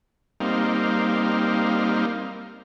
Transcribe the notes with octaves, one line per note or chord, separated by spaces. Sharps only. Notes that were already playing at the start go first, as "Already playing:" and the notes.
G3 A#3 C4 D#4 F5